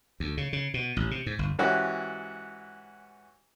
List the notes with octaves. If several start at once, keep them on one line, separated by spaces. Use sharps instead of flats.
D2
C#3
C#3
B2
A1
C3
G#2
G1
G#2 E3 C#4 E4 F#4 G4